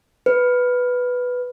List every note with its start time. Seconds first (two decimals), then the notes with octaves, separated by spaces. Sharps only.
0.26 B4